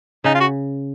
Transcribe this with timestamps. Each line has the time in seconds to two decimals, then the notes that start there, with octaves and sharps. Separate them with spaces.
0.24 C#3 D#4
0.35 F4
0.40 F#4